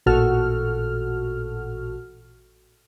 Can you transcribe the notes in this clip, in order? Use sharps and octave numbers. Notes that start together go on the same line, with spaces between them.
A1 A#2 F#4 A4 F6